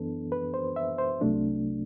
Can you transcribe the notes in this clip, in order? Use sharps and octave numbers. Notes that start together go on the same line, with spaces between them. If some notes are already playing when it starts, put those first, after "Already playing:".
Already playing: F#2 E3 B3 D4 A4
B4
C5
E5
C5
C2 C3 F#3 A3 D4